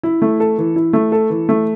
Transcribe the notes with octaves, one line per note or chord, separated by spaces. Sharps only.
E4
A3
A4
E3
E4
A3
A4
E3
A3